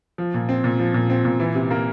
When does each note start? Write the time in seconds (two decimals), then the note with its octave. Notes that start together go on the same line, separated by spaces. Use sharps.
0.18 F3
0.34 A#2
0.49 C4
0.64 A#2
0.79 F3
0.94 A#2
1.10 C4
1.25 A#2
1.40 E3
1.55 C3
1.71 A#3